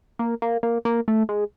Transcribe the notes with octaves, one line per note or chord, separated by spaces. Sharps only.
A#3
A#3
A#3
A#3
A3
G#3